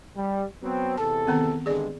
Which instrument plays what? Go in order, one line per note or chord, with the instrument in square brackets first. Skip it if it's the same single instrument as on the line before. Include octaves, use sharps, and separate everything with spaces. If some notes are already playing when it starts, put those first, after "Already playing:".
[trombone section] G3
F#3 B3 C4
[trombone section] E2 C3 A4 [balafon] A5
[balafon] D#3 B3 C4
[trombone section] G2 D3 G#3 [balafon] G#4 D5